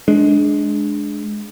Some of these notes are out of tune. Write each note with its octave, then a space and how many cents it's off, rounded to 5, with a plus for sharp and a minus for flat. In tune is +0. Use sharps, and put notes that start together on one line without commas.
G#3 +15 D4 +0